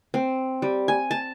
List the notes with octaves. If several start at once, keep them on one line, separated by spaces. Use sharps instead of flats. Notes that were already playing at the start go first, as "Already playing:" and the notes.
C4
G3
G#5
A5